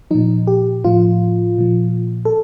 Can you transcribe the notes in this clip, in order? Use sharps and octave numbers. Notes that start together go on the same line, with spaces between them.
A#2 F3 D#4
G4
A2 F3 F4
A#2 F3
A4